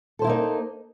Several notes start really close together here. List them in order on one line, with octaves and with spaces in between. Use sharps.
A4 C5 E4 A#3 D#4